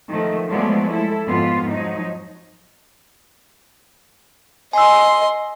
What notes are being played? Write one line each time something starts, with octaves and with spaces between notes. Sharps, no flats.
D#3 F3 A3
F3 F#3 G#3 A3 B3 D5
E4 A4
F2 G#2 B3 F4
F3 F#3 D#4
D#5 G#5 C6 E6